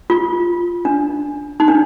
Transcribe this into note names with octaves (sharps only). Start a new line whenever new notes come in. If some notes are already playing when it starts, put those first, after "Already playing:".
F4
D4
D#4
D4